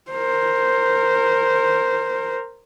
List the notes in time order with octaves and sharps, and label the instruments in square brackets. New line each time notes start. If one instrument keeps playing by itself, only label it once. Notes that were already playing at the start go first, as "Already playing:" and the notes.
[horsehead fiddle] A#4 C5